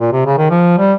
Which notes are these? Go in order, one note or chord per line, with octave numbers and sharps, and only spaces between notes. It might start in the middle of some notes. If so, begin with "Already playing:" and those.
A#2
C3
C#3
D#3
F3
G3